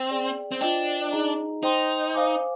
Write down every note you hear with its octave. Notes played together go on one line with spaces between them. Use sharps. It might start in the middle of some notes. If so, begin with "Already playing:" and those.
Already playing: C4
G#4 D5 G5
C4
D4 F4 C5 D#5 G5
D#4 G#4 D#5 A#5
D#4 C5 G5 C6
C5 F5 G#5 D6